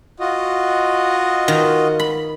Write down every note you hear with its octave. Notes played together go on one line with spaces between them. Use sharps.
F4 F#4 D#5
D#3
B5